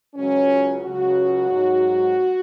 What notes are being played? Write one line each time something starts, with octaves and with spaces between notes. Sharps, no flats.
C#2 C#3 F#3 C#4
C#2 C#3 F#3 F#4
G#2 F#3